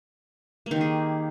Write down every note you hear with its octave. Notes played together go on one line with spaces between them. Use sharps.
D#3 A#3 G4 G#4